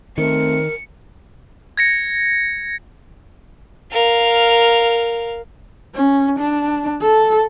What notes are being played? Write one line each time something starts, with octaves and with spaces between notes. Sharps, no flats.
D#3 A3 C4 A#4 C#7
G#6 A#6 C#7
A#4 F5
C#4
D4
A4